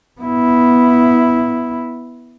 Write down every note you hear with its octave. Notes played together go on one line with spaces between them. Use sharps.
B3 E4